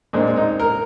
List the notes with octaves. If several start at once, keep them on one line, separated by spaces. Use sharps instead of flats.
A#2 G#3 C4 D4
D#4
A#4